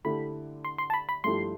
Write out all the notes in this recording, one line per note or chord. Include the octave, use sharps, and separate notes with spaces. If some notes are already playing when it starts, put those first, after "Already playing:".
D3 A3 E4 G4 B5
C6
C6
A5
B5
B5
G2 F3 A3 E4 G4 C6